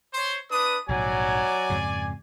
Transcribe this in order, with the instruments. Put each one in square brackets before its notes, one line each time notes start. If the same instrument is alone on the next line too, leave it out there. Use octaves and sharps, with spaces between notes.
[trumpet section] C5 C#5 C6
[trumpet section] D4 D#6 [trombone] B4
[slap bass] A#1 G#2 C3 [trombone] F#3 [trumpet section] D5 G#5
[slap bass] F2 G#2 C#3